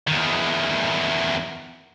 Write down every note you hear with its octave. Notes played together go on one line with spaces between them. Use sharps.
E2 D#3